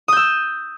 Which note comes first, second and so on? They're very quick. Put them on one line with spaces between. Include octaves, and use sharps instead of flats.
D#6 G6 E6